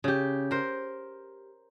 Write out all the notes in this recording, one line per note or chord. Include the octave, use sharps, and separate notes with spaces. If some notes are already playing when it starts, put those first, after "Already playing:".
C#3 G4
A#4 C5